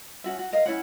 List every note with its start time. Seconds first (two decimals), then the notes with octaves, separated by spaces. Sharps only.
0.24 C#4 F#4 E5
0.39 F#4
0.52 A#4 D#5 F5
0.66 C#4 E4 C#5 F#5